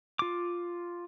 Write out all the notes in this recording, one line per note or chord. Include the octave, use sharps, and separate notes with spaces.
F4 D6